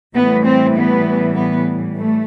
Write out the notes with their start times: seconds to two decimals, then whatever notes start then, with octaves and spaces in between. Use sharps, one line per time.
0.14 A2 E3 G3 B3
0.44 C4
0.75 B3
1.36 B3
1.96 A3